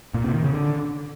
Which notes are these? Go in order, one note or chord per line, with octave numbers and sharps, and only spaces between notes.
A#2
C3
D#3
C#3
D3